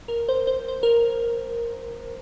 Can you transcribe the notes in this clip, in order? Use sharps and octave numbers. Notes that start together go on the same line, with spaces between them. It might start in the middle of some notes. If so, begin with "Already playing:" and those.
A#4
C5
C5
C5
A#4